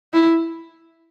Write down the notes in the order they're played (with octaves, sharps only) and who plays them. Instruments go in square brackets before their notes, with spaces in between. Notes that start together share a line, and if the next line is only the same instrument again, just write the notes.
[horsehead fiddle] E4